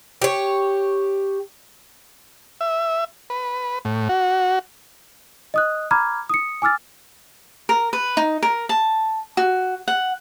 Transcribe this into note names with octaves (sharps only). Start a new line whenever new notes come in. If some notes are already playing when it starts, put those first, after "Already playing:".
G4 C#5
E5
B4
A2
F#4
D#5 D#6 F#6
A#5 B5 D6 F6 G#6
D#6 C#7
G#5 D6 E6 F6 A6
A#4
B4
D#4
A#4
A5
F#4
F#5